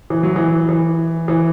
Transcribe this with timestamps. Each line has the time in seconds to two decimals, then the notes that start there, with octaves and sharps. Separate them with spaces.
0.10 E3
0.23 F#3
0.36 E3
0.69 E3
1.28 E3